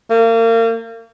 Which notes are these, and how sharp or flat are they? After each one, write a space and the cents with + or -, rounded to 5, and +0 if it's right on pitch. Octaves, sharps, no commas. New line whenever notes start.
A#3 -35